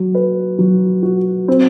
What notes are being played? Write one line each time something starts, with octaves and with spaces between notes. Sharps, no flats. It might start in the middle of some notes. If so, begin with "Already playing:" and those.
Already playing: F#3
B4
F#3
F#4
C4